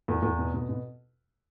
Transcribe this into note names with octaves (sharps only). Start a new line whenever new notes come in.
E2
E2
B2
B2
B2